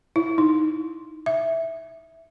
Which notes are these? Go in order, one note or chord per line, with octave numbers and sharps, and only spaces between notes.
E4
D#4
E5